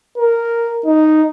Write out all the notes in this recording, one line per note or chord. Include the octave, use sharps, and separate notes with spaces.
A#4
D#4